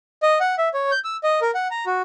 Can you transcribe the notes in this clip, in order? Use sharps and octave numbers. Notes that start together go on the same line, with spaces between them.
D#5
F#5
E5
C#5
G6
E6
D#5
A#4
F#5
A#5
F#4